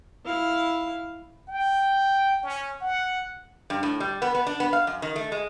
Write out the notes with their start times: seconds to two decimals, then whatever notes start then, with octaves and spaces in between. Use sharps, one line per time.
0.25 E4 F5
1.48 G5
2.43 C#4
2.81 F#5
3.70 G2
3.83 A2
4.00 G3
4.22 B3
4.34 B3
4.47 D4
4.60 B3
4.73 F5
4.87 F#2
5.02 D#3
5.16 A3
5.32 G#3